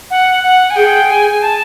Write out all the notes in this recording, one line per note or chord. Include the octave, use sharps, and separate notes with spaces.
F#5
F#5
G#5
G#4 G5
G#5
A5